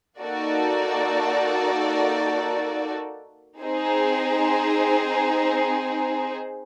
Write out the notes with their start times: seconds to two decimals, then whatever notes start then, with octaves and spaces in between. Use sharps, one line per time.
0.20 A#3 D#4 F#4 A4 D5
3.61 C4 D#4 G#4 C5